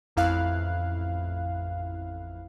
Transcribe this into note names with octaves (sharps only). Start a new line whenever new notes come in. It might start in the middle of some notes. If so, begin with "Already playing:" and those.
A1 F2 E4 F5 F#6